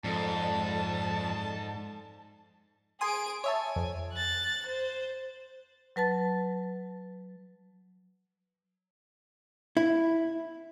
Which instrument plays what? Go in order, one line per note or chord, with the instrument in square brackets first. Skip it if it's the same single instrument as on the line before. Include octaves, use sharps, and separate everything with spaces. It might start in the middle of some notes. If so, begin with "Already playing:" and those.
[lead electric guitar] F2 [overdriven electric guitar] G#2 [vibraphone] A4 D5 [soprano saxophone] A5
[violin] G#4 D7 [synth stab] G#5 C6 D#6
[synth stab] C#5 E5 A5 [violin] G#5
[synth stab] F2
[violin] F#6 A6
C5
[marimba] F#3 B4 A5 A6
[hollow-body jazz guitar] E4